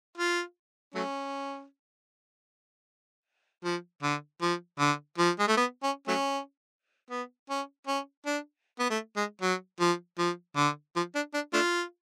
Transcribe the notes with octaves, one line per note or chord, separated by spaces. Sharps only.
F4
F#3 A3 C#4
F3
D3
F3
D3
F3
G#3
A3
B3
C#4
F#3 A3 C#4
B3
C#4
C#4
D4
B3
A3
G#3
F#3
F3
F3
D3
F3
D4
D4
A3 D4 F4